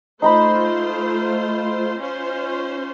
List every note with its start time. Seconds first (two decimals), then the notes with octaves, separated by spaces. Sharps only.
0.22 A3 D#4 F4 C5 A#5 B5
1.98 C#4 F4 C5